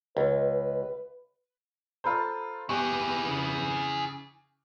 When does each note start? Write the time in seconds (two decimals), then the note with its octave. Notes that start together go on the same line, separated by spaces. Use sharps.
0.17 C#2 B4
2.04 F4 A4 C5 A#5 B5 E6
2.69 B3 E4 G4 G#4 C#6
3.28 C#3